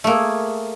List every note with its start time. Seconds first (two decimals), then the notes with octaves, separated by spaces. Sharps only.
0.04 A3
0.07 A#3
0.10 G#4